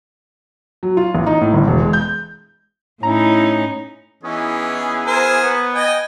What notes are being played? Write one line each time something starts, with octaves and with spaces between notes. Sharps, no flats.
F#3
F4
A1
D#4
A2
G1
E1
G#3
G6
A2 C#4 D#4 E4 A#5
E3 B3 C#4 D#4 E4 G#4
A#4 C5 G#5
B3
D#5 G5 G#5